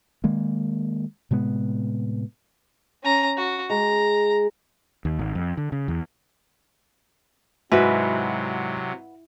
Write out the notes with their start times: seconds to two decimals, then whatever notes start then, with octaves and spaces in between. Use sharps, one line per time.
0.24 D#3 G#3 A#3
1.31 A2 C3 G#3 B3
3.03 C#4 A#5
3.37 F#4
3.70 G#3 A#5
5.05 D#2
5.19 G#1
5.35 F2
5.57 D3
5.72 C#3
5.88 E2
7.72 G#2 C3 F#3 E4 F#4 B4